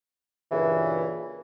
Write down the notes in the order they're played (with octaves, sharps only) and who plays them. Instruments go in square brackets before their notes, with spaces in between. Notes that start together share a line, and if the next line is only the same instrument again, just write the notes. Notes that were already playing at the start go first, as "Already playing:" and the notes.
[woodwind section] G2 A#2 C#3 E3